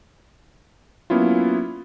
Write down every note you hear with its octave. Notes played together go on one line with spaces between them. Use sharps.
F#3 A#3 B3 C#4 E4 F4